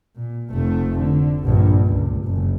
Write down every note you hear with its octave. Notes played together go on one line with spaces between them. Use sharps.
A#2
F1 A3
D3
A#1 G2
C#2
F#1